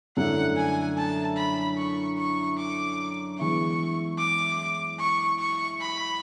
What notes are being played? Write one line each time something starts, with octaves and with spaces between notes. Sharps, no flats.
F#2 D3 A3 E4 F#5
G#5
A5
B5
C#6
C#6
D6
E3 G#3 B3 E4 C#6
D6
C#6
C#6
B5